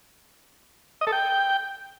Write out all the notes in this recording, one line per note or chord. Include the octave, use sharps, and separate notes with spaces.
D#5
A4
G5